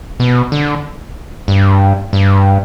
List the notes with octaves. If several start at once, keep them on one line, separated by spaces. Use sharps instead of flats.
B2
D3
G2
G2